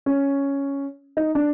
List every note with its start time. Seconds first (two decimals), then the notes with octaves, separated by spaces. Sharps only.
0.06 C#4
1.17 D#4
1.35 D4